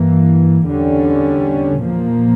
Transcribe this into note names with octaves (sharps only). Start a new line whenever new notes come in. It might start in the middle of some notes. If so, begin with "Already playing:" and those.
Already playing: G2 E3 A#3
E2 D3 G3 C#4
A#2 F3 A#3